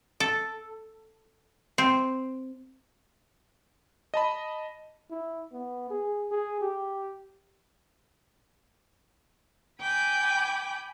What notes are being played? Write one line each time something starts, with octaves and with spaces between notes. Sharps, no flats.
A4
C4
D#5 A5 B5
E4
B3
G#4
G#4
G4
G5 G#5 B5 D6 G6